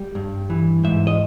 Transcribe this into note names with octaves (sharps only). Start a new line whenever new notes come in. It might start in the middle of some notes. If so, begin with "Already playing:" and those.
Already playing: G3
G2
E3
G#2 E5
D#5